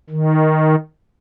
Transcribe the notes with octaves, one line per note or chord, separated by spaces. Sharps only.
D#3